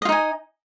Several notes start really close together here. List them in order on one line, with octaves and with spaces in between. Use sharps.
D#5 F4 D#4 G#5